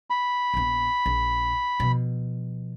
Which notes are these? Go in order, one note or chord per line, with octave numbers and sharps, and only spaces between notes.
B5
A#1 B3
A#1
B2 F3